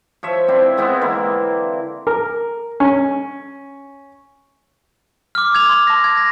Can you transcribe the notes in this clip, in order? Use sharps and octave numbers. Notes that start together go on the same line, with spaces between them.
F3 C#5 E5
C4 D4 E4
G#3 B3 C4 E4
D3 E3 A#3 E4
A#4
C#4
D6 F6
D6 E6 G#6 F7
C6
A5 A#6
G#6
A#6